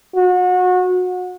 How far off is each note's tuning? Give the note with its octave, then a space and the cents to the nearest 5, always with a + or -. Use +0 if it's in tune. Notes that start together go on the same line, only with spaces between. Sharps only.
F#4 -30